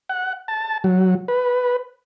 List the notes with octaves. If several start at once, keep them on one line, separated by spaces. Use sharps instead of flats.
F#5
A5
F#3
B4